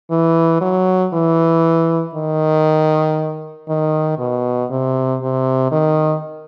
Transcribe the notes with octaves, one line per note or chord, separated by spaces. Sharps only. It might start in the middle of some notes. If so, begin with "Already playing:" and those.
E3
F#3
E3
D#3
D#3
B2
C3
C3
D#3